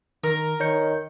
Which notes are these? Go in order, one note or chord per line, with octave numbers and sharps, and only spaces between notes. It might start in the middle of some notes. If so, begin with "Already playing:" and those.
D#3 A#4
D#3 C#5 G6 C#7